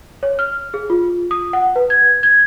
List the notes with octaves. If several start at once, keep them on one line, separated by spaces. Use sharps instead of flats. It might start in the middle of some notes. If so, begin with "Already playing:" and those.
C#5
F6
G#4
F4
D#6
F#5
B4
G#6
G#6